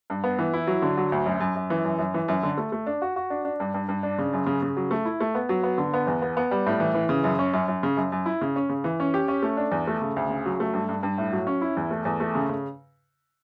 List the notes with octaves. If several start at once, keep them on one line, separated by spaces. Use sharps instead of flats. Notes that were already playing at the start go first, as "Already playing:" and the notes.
G2
B3
E3
E4
F#3
D3
F#3
D2
F#2
F#2
F#2
E3
F#2
F#2
E3
F#2
D3
A3
A3
D4
F#4
F#4
D4
D4
G2
G2
G2
D4
C#3
F#2
C#3
C#3
F#3
A3
E4
A3
B3
F#3
B3
D3
B3
E2
B3
B3
G3
A2
E3
E3
C#3
F#2
C#4
F#2
F#2
C#3
F#2
F#2
E4
C#3
C#4
C#3
E3
C#4
G4
C#4
A3
D4
E2
A3
C#3
D2
C#3
F#3
A3
G2
G2
G2
A2
F#3
C#4
E4
E2
A3
E2
A3
C#3
C#3